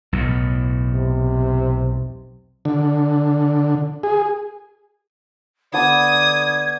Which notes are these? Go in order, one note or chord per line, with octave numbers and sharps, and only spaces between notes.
B1 E2 A2
C3
D3
G#4
D3 B3 D5 A5 D6 D#6 G#6